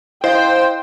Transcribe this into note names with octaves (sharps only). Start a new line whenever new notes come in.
E4 C5 D#5 F5 G5